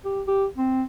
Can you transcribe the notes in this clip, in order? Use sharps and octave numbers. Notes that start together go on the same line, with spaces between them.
G4
G4
C4